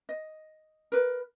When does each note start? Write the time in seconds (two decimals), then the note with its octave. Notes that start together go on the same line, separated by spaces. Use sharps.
0.09 D#5
0.92 A#4 B4